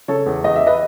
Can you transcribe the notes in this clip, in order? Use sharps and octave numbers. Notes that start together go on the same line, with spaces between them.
C#3 A4 C#5
E2
E2 D#5
E5
B4 D#5